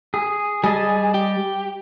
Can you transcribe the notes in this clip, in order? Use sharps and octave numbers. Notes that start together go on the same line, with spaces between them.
G#4
G3 G#4 D#5 A5
G4